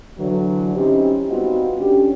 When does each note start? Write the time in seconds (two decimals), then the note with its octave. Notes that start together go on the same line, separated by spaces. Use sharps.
0.19 D3 E3 F#3
0.76 C4 C#4 D#4 E4 G4
1.30 G3 B3 C4 D#4 F4 F#4
1.80 D3 C#4 G4